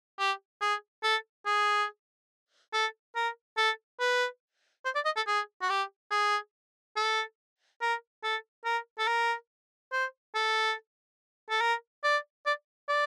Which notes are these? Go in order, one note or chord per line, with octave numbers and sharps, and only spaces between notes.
G4
G#4
A4
G#4
A4
A#4
A4
B4
C5
D5
D#5
A4
G#4
F#4
G4
G#4
A4
A#4
A4
A#4
A4
A#4
C5
A4
A4
A#4
D5
D5
D5